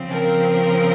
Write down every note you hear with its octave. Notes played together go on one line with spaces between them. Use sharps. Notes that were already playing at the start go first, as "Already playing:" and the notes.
Already playing: C#3 F3 C4
A#4